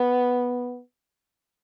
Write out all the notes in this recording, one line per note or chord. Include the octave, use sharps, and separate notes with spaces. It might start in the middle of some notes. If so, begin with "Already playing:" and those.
Already playing: B3